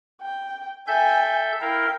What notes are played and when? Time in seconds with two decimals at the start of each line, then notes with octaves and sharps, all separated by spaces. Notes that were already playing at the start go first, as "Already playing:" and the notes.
0.22 G5
0.87 A4 E5 G5 G#5 G6
1.61 E4 A#4 F5 G5